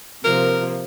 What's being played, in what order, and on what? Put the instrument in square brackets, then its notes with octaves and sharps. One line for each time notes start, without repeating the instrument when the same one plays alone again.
[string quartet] C3 F3 A#3 [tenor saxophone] A#4